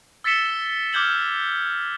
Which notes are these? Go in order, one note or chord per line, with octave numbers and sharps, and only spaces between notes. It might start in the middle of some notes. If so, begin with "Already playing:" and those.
E6 A6 B6 C#7 E7 G7
D6 F6 G6 G#6 F#7 G7